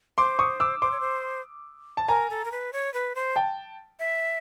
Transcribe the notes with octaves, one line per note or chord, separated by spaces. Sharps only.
C5 C6 D6
C#6 D#6
D6 E6
C5 C6 D6
C#5
C5
A5
A#4 G#5 A#5
A4
A#4
B4
C#5
B4
C5
G5 A5
E5